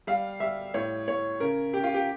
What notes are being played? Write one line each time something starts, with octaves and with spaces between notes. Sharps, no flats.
G3 F5
G3 E5
A2 C#5
A2 C#5
C#3 A#4
C#3 G4
F4
G4